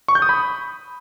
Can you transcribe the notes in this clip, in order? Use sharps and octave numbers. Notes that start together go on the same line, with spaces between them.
C#6
G6
D#6
B5